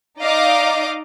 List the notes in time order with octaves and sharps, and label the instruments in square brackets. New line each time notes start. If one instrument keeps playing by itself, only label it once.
[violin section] D#4 D5 D#5 F5 D6